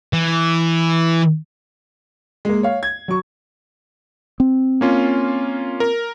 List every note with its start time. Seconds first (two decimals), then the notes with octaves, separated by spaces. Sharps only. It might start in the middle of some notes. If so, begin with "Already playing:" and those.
0.13 E3
2.45 G#3 A#3
2.63 C#5 F5
2.83 G#6
3.08 F#3 C#6
4.40 C4
4.81 A#3 C#4 F4
5.80 A#4